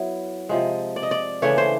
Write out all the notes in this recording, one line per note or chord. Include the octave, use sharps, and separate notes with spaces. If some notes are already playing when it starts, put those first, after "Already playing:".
Already playing: F#3 B3 E4
C3 F3 G#3
D5
D#5
D5
C#3 E3 A3 D4 C#5
C5